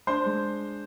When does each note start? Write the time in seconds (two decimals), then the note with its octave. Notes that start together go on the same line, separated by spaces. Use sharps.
0.07 D4 C5 C6
0.26 G#3